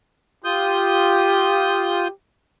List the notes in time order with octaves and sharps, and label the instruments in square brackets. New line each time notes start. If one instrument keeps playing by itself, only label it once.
[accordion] F4 D#6 G6 [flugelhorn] G4